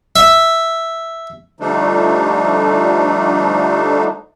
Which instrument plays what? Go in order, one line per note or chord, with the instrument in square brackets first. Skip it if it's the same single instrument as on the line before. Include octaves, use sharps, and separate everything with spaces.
[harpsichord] E5
[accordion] D3 F3 G3 A3 D4 D#4